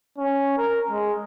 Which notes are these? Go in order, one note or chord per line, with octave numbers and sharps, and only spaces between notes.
C#4
A#4
G#3